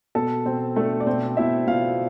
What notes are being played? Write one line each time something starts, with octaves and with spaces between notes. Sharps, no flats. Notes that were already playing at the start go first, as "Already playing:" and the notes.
B2 A4 A5
B2 C4 C5
A3 D4 A4
D5
B2 C4 C5
B2 E4 E5
B2 F4 F5